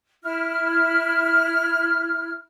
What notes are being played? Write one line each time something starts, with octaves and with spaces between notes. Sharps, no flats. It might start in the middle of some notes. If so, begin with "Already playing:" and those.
E4 F6